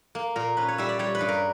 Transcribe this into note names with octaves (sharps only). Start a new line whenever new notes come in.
A#3
A#2 A#4
C#4 B4
C#5
G3 E5
D5
G3 C#5
B4
G2
A#4